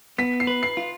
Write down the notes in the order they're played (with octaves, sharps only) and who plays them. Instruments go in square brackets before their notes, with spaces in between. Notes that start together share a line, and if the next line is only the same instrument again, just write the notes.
[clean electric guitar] B3 [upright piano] B6
[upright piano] C7
[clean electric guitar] B4
[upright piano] C7
[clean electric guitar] F4